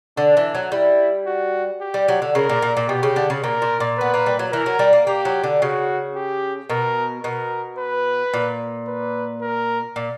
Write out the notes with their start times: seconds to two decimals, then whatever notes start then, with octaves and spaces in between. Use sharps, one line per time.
0.17 D3 D4
0.37 E3
0.55 F#3
0.72 G3 E4
1.27 F#4
1.81 G4
1.94 G3
2.08 F#3
2.22 D3
2.35 C#3 A#4
2.49 A#2
2.62 A#2
2.77 A#2
2.89 B2 G4
3.03 C#3
3.16 D3
3.30 C#3
3.44 A#2 A#4
3.62 A#2
3.80 A#2
3.98 B3 B4
4.14 A#3
4.26 G3
4.39 F#3
4.52 E3 A#4
4.66 F#3
4.79 G3
4.93 A#3
5.07 A#3 G4
5.25 F#3
5.44 D3
5.61 C#3 F#4
6.16 G4
6.70 B2 A#4
7.24 B2 A#4
7.79 B4
8.34 A#2
8.88 B4
9.42 A#4
9.96 A#2